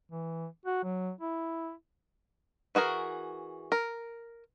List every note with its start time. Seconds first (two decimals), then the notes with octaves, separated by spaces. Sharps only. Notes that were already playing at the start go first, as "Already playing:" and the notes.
0.12 E3
0.66 F#4
0.84 F#3
1.21 E4
2.75 E3 F#4 G#4 A#4
3.72 A#4